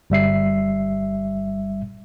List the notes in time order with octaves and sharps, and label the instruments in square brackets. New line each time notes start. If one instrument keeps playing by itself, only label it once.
[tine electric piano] G1 G3 E5 C7